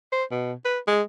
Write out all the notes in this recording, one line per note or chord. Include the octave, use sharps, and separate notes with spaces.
C5
B2
B4
G#3